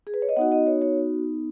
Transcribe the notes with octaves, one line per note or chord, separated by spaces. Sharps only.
G#4
B4
C#5
D#5
B3 D#4 F#4 F#5
D#5
C#5
C#5